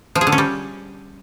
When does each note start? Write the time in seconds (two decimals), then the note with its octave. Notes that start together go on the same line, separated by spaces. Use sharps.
0.15 F3
0.21 G#4
0.27 D3
0.32 C#4
0.38 G3